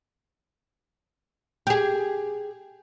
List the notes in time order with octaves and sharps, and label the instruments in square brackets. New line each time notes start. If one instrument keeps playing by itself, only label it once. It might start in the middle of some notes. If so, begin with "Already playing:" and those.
[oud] G4 G#4